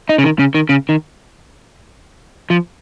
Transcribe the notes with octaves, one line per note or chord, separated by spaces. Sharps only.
D#4
C#3
D#3
C#3
D#3
C#3
D#3
F3